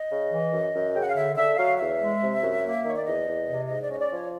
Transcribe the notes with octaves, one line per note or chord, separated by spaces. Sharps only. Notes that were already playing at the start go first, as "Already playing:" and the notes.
Already playing: D#5
C#3
E3
F#2
F#2
C#3 G5
F#5
F5
D3 E5
D3 E5
F#3 F5
E2 E5
G#3
C3
F#2
A#3
D#3 C#5
D5
E2 D#5
E2
C3
G#2 D#5
D5
C#4 D#5
D5
F3 C#5